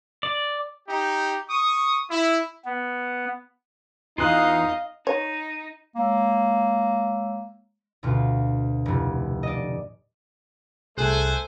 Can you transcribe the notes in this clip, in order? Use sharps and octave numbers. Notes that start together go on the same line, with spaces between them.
D5
D#4 G4
C#6 D#6
E4
B3
E2 D#4 F4 D#5 F5 G#5 F#6
D#4 C#5
G#3 A#3 C#5 E6
D2 B2 F4
F1 A2
D5 D#5
C2 A3 G#4 C5 G#5 F#6